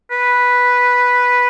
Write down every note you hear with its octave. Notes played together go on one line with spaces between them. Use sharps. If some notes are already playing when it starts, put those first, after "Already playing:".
B4